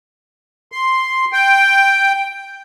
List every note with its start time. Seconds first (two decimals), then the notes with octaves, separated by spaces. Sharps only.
0.72 C6
1.33 G5